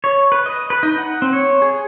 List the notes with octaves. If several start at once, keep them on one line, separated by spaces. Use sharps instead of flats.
C#5
B4
D#5
B4
D#4
F#5
C4
C#5
G#4